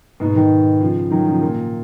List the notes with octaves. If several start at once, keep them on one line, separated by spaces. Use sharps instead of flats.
G#2 B2
B2 D#3
C#3 F3
D#3 F#3
C#3 F3
A#2